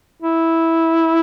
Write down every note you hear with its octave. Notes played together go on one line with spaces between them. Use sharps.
E4